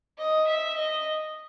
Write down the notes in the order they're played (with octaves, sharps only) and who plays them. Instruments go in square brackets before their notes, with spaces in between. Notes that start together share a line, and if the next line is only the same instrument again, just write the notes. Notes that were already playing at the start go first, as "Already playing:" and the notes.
[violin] D#5
E5
D#5